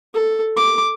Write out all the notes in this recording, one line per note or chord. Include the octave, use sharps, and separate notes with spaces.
A4
D6